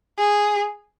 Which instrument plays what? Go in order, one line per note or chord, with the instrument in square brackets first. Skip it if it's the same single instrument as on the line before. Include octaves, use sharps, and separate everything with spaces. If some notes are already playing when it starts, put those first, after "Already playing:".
[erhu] G#4